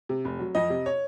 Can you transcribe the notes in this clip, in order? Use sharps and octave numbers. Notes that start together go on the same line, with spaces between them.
C3
F1
F#3
F2 D#5
C3
C#5